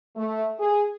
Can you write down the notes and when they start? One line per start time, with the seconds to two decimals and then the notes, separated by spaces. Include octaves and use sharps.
0.17 A3
0.60 G#4